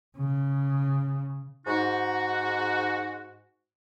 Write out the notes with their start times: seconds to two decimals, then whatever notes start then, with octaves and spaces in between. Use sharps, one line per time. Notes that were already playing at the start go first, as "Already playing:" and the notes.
0.17 C#3
1.67 G#2 D#4 F#4